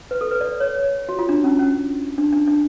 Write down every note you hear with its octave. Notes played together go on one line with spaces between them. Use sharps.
B4
A4
B4
D5
C#5
F#4
F4
D4
C#4
C#4
D4
D4
D4